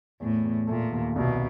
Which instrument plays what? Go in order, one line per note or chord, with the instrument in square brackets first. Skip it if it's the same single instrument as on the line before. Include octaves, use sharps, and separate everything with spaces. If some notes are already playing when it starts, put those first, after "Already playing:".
[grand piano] E2 [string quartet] A2
[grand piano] E2
[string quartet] A#2 [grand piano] A3
[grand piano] D#2
[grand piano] C2 [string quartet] B2